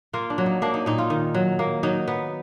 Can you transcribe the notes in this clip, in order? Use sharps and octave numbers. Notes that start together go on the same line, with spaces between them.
A#3 F4
D4
F#3
D#4
A#3 D4
D#4
A#2 D#4
F4
D#3
F#3
A#3
F#3 D#4
B3